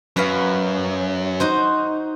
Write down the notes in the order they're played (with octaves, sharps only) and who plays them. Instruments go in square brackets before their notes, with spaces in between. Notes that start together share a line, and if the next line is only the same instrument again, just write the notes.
[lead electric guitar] F#2 [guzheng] F#4 B4 F5
[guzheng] D#4 F#4 C5